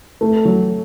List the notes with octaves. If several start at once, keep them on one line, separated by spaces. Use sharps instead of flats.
A3
F#3